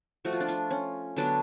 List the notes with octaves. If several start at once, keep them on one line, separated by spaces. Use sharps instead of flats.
F3 A3 F#4
F4
D4
F4
C#4
D3 F#3 B3 D4